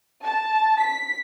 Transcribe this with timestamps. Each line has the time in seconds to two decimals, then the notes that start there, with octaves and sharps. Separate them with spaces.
0.24 A5
0.81 B6